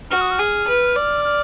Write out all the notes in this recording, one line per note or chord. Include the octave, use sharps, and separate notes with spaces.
F#4 F6
D#6
F6
G#4
B4
D5
F6